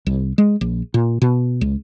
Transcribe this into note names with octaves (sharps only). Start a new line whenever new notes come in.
C2
G#3
A#1
A#2
B2
C#2